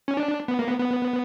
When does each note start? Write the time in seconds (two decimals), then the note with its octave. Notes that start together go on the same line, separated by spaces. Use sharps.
0.08 C#4
0.17 D4
0.48 B3
0.59 A#3
0.68 B3
0.79 B3